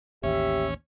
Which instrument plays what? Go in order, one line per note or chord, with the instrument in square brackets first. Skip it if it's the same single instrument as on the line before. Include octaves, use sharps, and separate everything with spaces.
[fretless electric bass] A1 D#2 [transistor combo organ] C#4 [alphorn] G4 [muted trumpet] E5